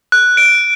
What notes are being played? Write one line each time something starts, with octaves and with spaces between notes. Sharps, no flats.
F#6
D7